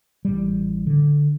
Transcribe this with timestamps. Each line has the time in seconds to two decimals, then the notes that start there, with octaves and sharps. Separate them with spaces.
0.25 A1 G3
0.87 D3